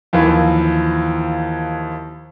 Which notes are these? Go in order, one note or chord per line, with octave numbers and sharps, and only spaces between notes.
D#2 E3 F3